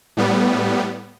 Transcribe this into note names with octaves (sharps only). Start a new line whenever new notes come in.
A2 G3 B3